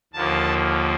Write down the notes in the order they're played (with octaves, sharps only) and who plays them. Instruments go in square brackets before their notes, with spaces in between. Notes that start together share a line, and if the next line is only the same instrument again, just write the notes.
[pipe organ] D#2 D3 F3 A#3 A5